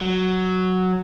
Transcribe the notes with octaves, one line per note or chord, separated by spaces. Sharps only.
F#3